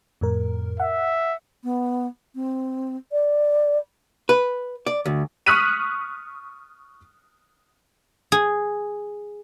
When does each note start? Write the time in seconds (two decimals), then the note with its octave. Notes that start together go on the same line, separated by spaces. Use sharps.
0.21 F2 A2 A#4
0.80 E5 F#5
1.64 B3
2.35 C4
3.12 D5
4.29 B4
4.87 D5
5.05 D2
5.46 C#6 D#6 F6 F#6 B6 D#7
8.32 G#4